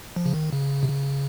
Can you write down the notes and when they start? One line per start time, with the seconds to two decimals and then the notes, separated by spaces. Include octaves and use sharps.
0.16 F3
0.26 C#3
0.34 D#3
0.53 C#3
0.83 C3
0.89 C#3